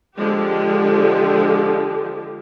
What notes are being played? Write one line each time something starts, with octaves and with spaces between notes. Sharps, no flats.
D3 F3 G#3 G4